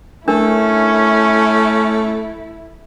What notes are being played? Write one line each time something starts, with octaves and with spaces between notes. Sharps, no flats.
A3 C#4 D4 E4 A#4